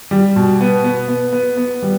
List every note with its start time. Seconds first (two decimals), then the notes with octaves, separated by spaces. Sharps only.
0.11 G3
0.36 B2
0.61 B3
0.84 B3
1.08 B3
1.33 B3
1.57 B3
1.82 G3